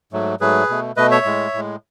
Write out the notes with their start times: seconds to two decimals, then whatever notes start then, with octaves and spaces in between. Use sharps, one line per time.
0.12 G#2 F#3 A3
0.41 G#2 F#3 A3 G#4 B4
0.69 B2 A3
0.97 B2 A3 B4 D#5
1.11 C#5 E5
1.25 A2 G#3
1.54 A2 G#3